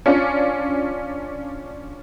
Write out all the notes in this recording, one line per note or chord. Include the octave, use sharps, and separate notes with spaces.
C#4 D4 F4